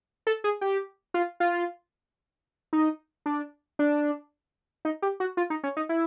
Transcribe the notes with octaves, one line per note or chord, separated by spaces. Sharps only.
A4
G#4
G4
F4
F4
D#4
D4
D4
D#4
G4
F#4
F4
D#4
C#4
D#4
E4